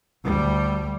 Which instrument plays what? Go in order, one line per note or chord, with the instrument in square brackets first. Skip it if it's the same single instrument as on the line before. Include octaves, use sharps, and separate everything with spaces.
[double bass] D2 G3